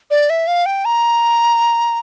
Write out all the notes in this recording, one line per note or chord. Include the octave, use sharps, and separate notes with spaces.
D5
E5
F5
G5
A#5